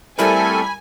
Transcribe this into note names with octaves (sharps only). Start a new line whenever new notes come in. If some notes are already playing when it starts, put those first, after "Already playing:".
G3 A3 C4 E4 A4 A#4 G#5 B5